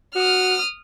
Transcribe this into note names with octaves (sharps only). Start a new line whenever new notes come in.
F#4 D#6 F6